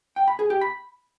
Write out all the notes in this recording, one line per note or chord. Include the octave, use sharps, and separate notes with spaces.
G5
B5
G#4
G4
B5